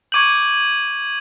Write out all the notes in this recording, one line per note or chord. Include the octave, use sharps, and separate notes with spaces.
C#6 D6 G6 G#6 D#7 F#7